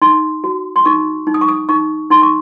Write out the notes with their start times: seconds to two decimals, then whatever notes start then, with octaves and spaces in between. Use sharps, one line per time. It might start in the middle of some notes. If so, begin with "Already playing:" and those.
0.02 D#4 C6
0.44 F#4
0.76 C6
0.85 D#4 C#6
1.27 D#4
1.34 D#6
1.41 C#6
1.48 D#6
1.69 D#4 C#6
2.10 D#4 C6
2.22 C#6